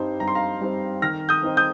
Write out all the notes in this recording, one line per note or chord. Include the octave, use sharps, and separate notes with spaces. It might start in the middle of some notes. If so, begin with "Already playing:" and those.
Already playing: G2 G3 C4 D#4 C5
G2 A#5
C6
F5 A#5
G3 C4 D#4 C5
D#3 F6 A#6
D#6 G6
C4 D#4 C5
D#6 G6